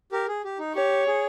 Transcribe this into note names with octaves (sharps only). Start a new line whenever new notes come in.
G4 A#4
G#4
G4
D#4
G4 C#5
G#4